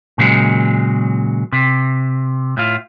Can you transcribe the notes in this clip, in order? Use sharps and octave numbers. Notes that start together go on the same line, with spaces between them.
A#2 C#3 F#3 G#3
C3
A2 F4